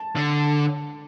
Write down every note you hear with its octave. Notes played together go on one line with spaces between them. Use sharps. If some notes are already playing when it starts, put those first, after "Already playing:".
Already playing: A5
D3